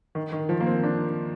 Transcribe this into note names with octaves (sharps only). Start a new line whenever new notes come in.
D#3
D#3
F3
A#3
C4
D4